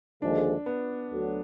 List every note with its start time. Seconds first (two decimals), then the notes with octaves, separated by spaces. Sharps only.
0.22 D#2 D3 F3 G#3 D4
0.66 B3
1.10 D2 D3 F#3